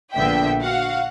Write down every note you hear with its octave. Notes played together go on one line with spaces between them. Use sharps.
A#1 D3 B3 E5 G5
F#4 F5 F#5